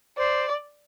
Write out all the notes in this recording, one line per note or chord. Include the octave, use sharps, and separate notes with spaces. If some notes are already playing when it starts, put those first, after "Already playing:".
C5 D5